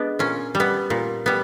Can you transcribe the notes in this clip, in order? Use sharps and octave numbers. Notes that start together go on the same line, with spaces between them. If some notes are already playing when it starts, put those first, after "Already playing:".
Already playing: G#3 B3 D4
A#2 C#4
G3
B3
A#2
G3 B3